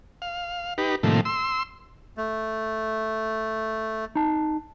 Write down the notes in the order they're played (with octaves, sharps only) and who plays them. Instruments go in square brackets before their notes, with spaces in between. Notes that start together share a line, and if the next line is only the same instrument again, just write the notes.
[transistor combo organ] F5
D#4 G4 B4
A2 C3 D#3 F3 A3 A#3
C6 E6
[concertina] A3
[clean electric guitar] D#4 A5